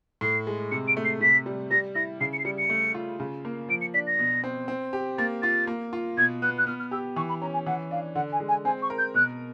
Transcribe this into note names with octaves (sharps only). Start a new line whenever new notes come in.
A2 C7
G#3
C3 C#7
D7
A3
C7
C3 B6
G3
G3 A#6
E4 A#6
C#3 C7
C#7
C7
G3 C#7
C#7
A3
F4
C#3
A#3
F3 D7
C#7
D4 B6
A#6
B2
C4
C4
G4
A#3 A6
F4 A6
A#3
F4
B2 G#6
B3 F#6
F#6
B3 F6
F6
G4 E6
E3 C#6
B5
C#4 A#5
G#5
E3 F#5
D4 F5
D3 F#5
G#5
G#3
G#5
C4 G#5
C#6
A#4
G6
B2 F#6